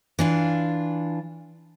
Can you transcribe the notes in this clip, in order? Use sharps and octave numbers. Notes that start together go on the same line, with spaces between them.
E3 D4 F4